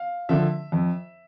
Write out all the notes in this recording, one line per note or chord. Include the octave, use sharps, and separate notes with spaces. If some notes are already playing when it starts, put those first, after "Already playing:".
Already playing: F5
D3 F3 E5
F2